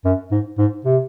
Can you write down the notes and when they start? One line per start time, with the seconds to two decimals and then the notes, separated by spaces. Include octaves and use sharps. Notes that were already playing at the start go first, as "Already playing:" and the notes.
0.05 F#2
0.31 G#2
0.58 G#2
0.85 C3